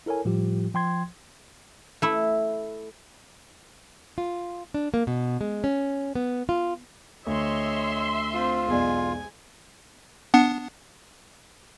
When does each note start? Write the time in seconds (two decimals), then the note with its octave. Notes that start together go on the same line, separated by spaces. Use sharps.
0.06 E4 A4 A#4 C#5 G#5
0.25 A2 F3 G3 F4 G4
0.74 F3 G5 C6 G#6
2.02 A3 E4
4.18 F4
4.74 D4
4.94 A#3
5.07 B2
5.41 G#3
5.64 C#4
6.15 B3
6.49 F4
7.27 D2 C#5 D#5 E5 C6
8.33 C4 F4 C5
8.68 B1 E2 G#3 D5 G#5
10.34 B3 D4 F#5